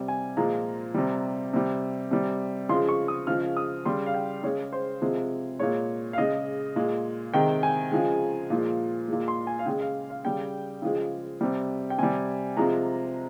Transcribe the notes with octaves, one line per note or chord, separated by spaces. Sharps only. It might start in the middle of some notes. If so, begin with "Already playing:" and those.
Already playing: C3 G3
G#5
A#2 F3 G#3 A#5
C3 G3
C3 G3
C3 G3
C#3 F3 G#3 C6
C#6
D#6
C#3 F3 G#3 F6
D#6
C#3 G3 C6
F5
G5
C#3 G#3 C#5
C5
C3 F3 G#3
A#2 G#3 C#5
F5
C#3 G#3 D#5
A#2 G#3
C3 D#3 G#3 G5
G#5
C#3 F3 G#3
A#2 F3 G#3
A#2 G#3
C6
G#5
F5
C#3 G#3 G5
F5
F5
C#3 G3 G5
C#3 F3 G#3
C3 G3
G5
C3 G3 G#5
C3 F3 G#3 A#5